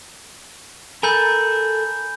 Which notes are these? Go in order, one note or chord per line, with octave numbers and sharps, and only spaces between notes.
A4 A#4 G#5 B5 G6